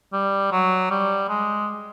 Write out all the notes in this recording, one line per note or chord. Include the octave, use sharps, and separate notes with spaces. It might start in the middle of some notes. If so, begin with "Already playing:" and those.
G3
F#3
G3
G#3